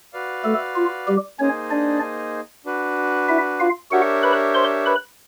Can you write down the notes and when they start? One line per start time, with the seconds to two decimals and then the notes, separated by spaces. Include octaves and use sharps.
0.13 F#4 B4 D5 F5
0.44 A3 A4
0.76 F4
1.07 G3 G4
1.39 A#3 C#4 D#4 G#4 C5 C#5 D#5
1.71 D4 D5
2.65 D4 F#4 B4
3.29 E4 E5
3.60 F4 F5
3.91 D4 F#4 G4 A#4 C#5 E5 F#5
4.23 B4 B5
4.54 C5 C6
4.86 B4 B5